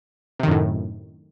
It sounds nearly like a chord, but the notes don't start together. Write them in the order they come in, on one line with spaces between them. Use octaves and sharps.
C3 D#3 F#2 A2